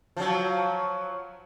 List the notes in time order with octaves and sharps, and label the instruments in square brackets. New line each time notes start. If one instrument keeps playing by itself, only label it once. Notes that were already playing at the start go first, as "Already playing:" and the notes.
[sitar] F3 F#3